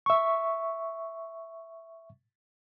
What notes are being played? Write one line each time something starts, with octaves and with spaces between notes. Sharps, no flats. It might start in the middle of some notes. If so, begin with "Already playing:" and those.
E5 C#6